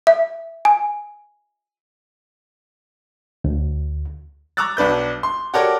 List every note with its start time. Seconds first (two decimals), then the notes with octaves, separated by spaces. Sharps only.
0.07 E5
0.65 G#5
3.44 D2
4.57 A#5 C#6 D6 E6 F#6 A6
4.77 B1 D4 B4 G6
5.23 C6
5.54 F#4 G4 A4 A#4 C#5 D5